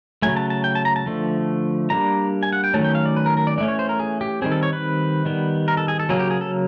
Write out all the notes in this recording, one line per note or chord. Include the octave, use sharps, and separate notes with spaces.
C#3 F#3 A3 G#5
A5
A5
G5
A5
A#5
A5
D3 F3 A3
G3 A#3 D4 A#5
G#5
F#5
G5
D#3 F#3 A3 C#4 A5
G5
F5
D5
B4
A#4
A#4
D5
E3 A3 C#4 D5
C#5
C5
A#4
G#4
G4
D#3 G3 C4 G#4
A4
C#5
B4
D#3 G3 B3
A#4
A4
G#4
A4
C#3 F#3 A#3 G#4
G4
G#4
A4